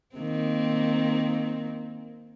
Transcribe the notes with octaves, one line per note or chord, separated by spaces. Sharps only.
D#3 A#3 C4